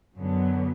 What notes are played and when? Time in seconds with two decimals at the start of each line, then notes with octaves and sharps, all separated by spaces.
0.15 F#2 D3 F#3 B3